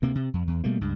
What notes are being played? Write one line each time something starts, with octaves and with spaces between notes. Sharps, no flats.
D2 C3 A#3
C3
F2
E2
B2 G3 A3 A#3
C#2 G2